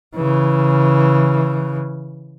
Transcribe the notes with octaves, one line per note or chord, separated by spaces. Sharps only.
C#3 E3